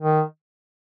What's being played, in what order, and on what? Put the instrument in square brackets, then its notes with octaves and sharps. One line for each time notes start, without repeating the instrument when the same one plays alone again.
[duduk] D#3